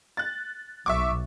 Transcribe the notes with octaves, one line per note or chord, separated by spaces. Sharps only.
F#6 A6
B1 E5 C#6 D6